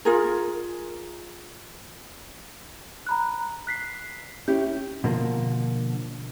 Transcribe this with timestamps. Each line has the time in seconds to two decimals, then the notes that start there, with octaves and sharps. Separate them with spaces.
0.05 F4 G#4 A#4
3.07 A#5 B5 F#6
3.67 F#6 B6 C7
4.48 C#4 E4 G4 G6
5.04 B2 D3 F3 A#3